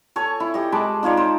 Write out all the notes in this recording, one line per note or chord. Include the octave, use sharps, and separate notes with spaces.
A4 C#5 G#5 C#6
E4
G4 D#5
G#3 A5 B5 D6
D#4 F4 C#5 D5
C5